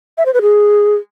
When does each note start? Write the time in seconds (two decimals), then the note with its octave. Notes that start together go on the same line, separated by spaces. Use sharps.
0.18 E5
0.26 C5
0.34 B4
0.42 G#4